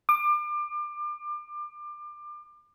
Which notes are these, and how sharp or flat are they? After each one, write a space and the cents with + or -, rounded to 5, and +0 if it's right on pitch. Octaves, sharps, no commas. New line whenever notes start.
D6 +30